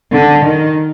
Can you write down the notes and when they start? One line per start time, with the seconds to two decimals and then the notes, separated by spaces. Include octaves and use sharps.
0.12 D3
0.45 D#3